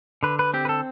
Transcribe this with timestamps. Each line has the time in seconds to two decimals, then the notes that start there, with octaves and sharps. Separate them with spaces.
0.23 D3 B4
0.39 B4
0.54 C4 G4
0.65 B4
0.69 A4